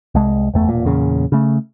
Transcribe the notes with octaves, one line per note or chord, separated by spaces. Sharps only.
C2 G#3
F#1 E2 A3
E1 A#2
E2 A#2 C#3
C#3 A3